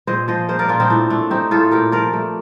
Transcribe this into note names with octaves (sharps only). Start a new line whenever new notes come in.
A#2 C5 D#5
F3 C5 D#5
A#3 C5 D#5
A#4 D5
A#2 D4 F4
C4 D#4
A2 D4
A3 D4
C4 D#4 G4
A2 F4 A4
A#2 G4 A#4
F3 A#4 D5
A3